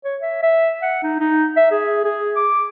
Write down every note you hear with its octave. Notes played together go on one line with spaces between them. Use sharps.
C#5
E5
E5
F#5
D#4
D#4
E5
G#4
G#4
D6